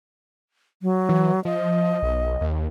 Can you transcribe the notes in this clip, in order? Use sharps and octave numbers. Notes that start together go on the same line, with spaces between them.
F#3
E3
F3 D#5
B1
D#2